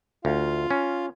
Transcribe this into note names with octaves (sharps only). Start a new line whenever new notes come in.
D2 F4 F5
C#4